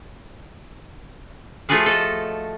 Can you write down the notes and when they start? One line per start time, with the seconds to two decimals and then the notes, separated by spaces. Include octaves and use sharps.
1.69 F3 A3 F4 F#4 G#4 F5
1.86 A4 D#5